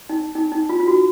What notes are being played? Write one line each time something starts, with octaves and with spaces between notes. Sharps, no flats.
D#4
D#4
D#4
F4
F4
F#4